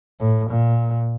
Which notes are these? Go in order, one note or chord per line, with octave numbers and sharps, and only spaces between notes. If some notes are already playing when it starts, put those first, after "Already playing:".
A2
A#2